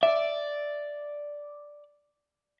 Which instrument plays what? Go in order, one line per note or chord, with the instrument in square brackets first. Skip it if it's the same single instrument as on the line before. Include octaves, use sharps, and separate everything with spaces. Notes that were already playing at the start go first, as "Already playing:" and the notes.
[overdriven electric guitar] D5 [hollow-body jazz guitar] E5